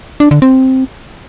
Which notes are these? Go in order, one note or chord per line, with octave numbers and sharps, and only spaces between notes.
D4
D3
C4